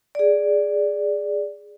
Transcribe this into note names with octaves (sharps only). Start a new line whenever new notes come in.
G#4 D5